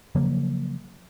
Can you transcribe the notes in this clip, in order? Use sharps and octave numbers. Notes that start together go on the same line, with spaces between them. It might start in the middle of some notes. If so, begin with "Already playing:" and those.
C#3 F3 F#3 A#3